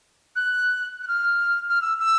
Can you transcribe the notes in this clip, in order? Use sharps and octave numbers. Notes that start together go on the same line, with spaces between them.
F#6
F#6
F6
F6
E6
E6